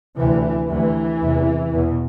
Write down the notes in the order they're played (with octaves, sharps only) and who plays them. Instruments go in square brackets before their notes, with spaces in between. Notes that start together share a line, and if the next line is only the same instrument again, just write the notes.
[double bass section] D2 C3 E3
D2 C3 E3
E2 C3
E2 B2